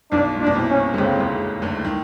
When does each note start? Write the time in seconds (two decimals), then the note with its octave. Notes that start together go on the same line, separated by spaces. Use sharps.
0.12 B1 B2 D4
0.36 A#2
0.41 D4
0.46 B2
0.55 C2 C3
0.69 C#4
0.94 D3
0.98 C#2 C#3 C4
1.19 C#2 C#3
1.62 D2 D3
1.85 D#3